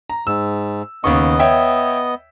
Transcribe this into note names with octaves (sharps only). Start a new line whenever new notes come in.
A#5
G#2 E6
D#2 C#3 B3 D#5 C#6
C#5 E5 G5